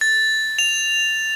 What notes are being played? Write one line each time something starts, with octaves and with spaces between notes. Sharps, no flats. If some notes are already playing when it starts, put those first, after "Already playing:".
A6
F7